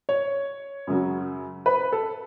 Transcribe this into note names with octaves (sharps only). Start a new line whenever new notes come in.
C#5
F#2 C#3 F#3
B4
A4